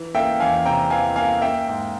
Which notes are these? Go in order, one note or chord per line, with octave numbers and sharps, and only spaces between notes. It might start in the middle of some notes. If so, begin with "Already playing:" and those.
Already playing: E3
A#3 E5 G5
E2 F5 G#5
C3 G5 A#5
E3 F5 G#5
A#3 F5 G#5
A#3 E5 G5
G#2